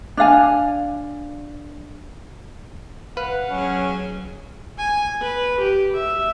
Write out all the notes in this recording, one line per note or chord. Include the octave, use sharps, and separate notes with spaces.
D4 D5 F5 G#5
B4 F5 F#5
F#3 C#4 G#4
G#5
B4
G4
E5